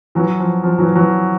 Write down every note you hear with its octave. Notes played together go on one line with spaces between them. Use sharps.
E3 F#3
F3
F3
E3 F#3
E3 F#3